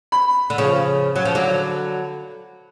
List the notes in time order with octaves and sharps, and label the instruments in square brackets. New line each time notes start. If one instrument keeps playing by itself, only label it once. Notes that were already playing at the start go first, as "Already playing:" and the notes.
[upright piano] B5
[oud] D3
C#3 F3
F#3
F3
D3 F#3